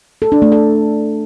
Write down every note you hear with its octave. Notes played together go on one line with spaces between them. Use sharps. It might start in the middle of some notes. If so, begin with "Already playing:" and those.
A4
D4
A3
A4